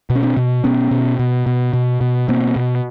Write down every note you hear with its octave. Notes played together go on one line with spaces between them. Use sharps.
B2
C#4
C4 D4
B2
B2 B3 C#4
B2
B2
B2
B2
B2
B2 A#3 C4
B2